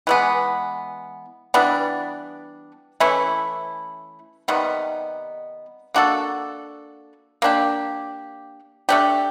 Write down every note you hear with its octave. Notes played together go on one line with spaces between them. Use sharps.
E3 G#3 B3
E3 G3 B3 D4
E3 A3 C#4 E4
C3 D#3 G3 B3
A#3 D4 F#4 A4
A#3 D4 G4
A3 D4 G4